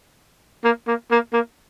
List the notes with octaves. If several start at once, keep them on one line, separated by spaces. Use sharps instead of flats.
A#3
A#3
A#3
A#3